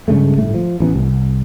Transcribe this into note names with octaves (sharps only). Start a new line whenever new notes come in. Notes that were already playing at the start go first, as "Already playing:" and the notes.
G2 C#3 G#3 A3
G1 A2 A3
F3
A1 E3 A#3 B3
C2